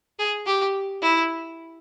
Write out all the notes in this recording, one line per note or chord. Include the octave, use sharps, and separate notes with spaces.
G#4
G4
E4